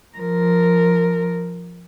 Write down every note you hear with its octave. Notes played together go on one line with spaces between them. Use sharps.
F3 A#4